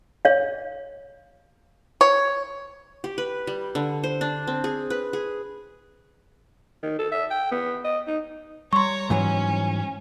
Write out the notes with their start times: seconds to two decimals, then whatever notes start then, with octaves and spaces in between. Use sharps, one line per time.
0.25 C#5 F5
2.01 C#5
3.04 G4
3.18 B4
3.47 G3
3.75 D3
4.04 C5
4.21 D4
4.47 C4
4.64 G#4
4.90 B4
5.13 G#4
6.83 D#3
6.99 A4
7.12 E5
7.30 G5
7.51 B3
7.84 D#5
8.07 D#4
8.73 G3 C#5 A#5 C6 C#6
9.10 G#2 E3 F#3 C#4